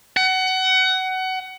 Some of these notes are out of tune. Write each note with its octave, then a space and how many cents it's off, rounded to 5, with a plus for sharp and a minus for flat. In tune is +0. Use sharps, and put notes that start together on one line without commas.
F#5 +25